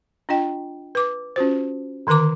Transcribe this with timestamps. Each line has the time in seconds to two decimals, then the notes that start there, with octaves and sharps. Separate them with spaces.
0.29 D4 F4 D#5 G5
0.95 B4 D6
1.36 C#4 F4 F#4 C5
2.07 D3 D#3 A#4 A#5 D6